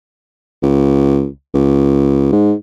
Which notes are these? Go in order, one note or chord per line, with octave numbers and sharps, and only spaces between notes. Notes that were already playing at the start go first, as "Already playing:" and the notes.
C#2
C#2
G#2